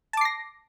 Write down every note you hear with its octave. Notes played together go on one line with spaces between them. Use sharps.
A5 D6 A#6 C7